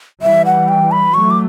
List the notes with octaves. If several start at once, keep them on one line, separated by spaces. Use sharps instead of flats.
E3 G3 E5
F#5
G5
B5
F#3 A3 C#6
D6